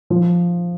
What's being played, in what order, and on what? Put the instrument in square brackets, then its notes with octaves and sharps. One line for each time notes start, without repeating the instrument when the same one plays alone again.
[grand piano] F3